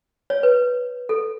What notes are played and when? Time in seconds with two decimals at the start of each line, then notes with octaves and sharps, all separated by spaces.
0.30 C#5
0.43 B4
1.09 A4